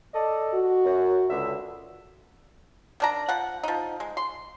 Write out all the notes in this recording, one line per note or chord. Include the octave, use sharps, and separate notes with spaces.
A4 D5 D#5
F#4
F#2
C#2 D3 E5
D#3 D4 A#5
F3 F#5
F3 D#4
G#3
C6